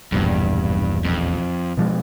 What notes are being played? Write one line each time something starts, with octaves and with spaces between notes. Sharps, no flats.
E1 A#1 E2 G2
F2
B2 F3 G#3